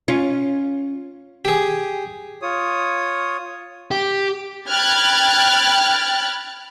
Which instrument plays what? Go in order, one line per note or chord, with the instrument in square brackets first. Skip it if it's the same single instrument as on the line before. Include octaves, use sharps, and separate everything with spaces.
[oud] C#4 F4
[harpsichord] G4 G#4
[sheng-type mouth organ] F4 C#5 D#6
[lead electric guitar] G4
[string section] G5 B5 F6 F#6 G#6 A6